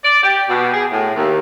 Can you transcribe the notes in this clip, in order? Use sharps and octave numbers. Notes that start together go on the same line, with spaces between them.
D5
G4
B2
G#4
A2
D#2